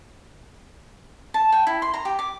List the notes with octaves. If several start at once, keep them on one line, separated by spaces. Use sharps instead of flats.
A5
G5
E4
C6
A#5
G4
D6